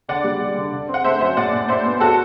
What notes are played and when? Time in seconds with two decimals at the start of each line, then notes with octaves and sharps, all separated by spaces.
0.08 D3 D5 F#5
0.24 G3
0.41 G3
0.57 D3
0.72 D3
0.89 C4
0.94 F#5
1.04 A3 C5 E5
1.21 F#2 C5 E5
1.37 A2 D5 F#5
1.53 A2
1.68 A2 C5 E5
1.86 B3
2.00 F#4 A4